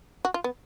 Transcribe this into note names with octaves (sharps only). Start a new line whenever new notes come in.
F#4
F4
B3